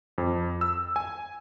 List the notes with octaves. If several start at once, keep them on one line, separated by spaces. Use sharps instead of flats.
F2
E6
G#5